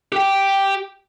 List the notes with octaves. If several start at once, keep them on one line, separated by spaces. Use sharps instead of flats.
G4 G5